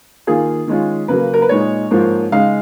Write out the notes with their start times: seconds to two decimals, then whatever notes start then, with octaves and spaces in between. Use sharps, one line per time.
0.27 D#3 A#3 F4 G#4
0.68 D#3 G#3 C#4 F4
1.08 C#3 F#3 A#3 B4
1.34 A#4
1.42 B4
1.49 A#2 G#3 D#4 C#5
1.91 G#2 F3 A#3 F4
2.32 C#3 G#3 D#4 F5